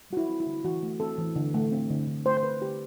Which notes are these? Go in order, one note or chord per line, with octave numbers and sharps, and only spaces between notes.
G3 F#4
E4
C4
E4
D3
E3 F#4
A3
C4 A4
E3
D3
A3
C4
D3
D3
A3 C5
C5
C4 B4
D3 G4